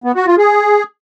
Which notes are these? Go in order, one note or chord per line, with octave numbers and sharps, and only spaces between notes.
B3
F#4
F4
G#4